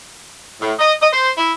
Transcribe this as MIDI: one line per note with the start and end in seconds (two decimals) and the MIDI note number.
0.60 0.72 45
0.79 0.92 75
1.01 1.08 75
1.12 1.30 72
1.38 1.52 64